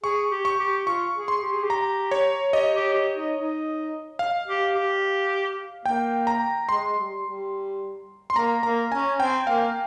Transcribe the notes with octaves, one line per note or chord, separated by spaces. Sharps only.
G#4 C#6
G4
C#6
G4
F4 C#6
G#4
C6
G4
G#4
G4
A#5
C#5
G4 D#5
G4
G4
D#4
D#4
F5
G4
G4
A#3 G5
A#5
G#3 C6
G3
G3
C6
A#3 A#5
A#3 A#5
C#4 G#5
C4 G5
A#3 F5